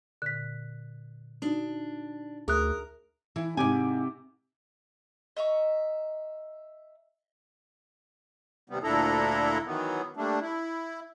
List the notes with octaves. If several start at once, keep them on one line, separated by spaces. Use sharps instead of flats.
A#2 D3 F#6 B6
D4 D#4 F#4
D2 G#4 A#4 E5 D#6 F#6
E3
G#2 C3 G#5 D6
D#5 E5 A#5 C#6
D#2 C3 G3 B3
D2 A#2 D4 E4 A4 A#5
D#3 E3 F#3 B3
G3 A3 A#3 D4
E4